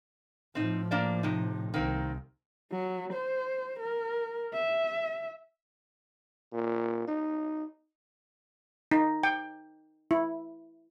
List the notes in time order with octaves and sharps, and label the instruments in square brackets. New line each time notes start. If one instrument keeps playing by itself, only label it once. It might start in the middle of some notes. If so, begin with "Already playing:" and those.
[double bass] A2 F3 [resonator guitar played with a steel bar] C4 D#4
[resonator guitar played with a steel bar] A#3 D4 D5
C3 D#4
[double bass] C2 [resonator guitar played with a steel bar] D#3 A#3 C4
[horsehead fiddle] F#3
C5
A#4
E5
[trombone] A#2
D#4
[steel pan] D#4
G5
E4